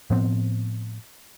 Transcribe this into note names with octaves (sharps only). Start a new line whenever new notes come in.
A2 F3 B3 C4